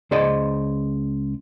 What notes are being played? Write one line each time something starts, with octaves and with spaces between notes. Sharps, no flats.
C#2 G#4 C5 D5 D#5